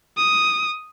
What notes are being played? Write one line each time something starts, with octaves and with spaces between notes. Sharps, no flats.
D#6